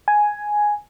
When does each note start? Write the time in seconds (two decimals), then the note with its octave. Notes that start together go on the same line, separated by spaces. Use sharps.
0.08 G#5